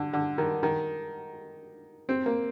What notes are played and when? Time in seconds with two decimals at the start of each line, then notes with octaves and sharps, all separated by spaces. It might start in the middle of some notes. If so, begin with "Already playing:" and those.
Already playing: D3
0.13 D3
0.38 D#3
0.63 D#3
2.09 C4
2.26 A#3